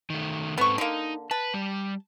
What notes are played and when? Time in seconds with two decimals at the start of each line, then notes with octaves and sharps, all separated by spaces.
0.10 D#3 A3
0.58 G#2 B3 C4 A4 C#6
0.78 D3 A#3 D#4
1.31 B4 A5
1.54 G3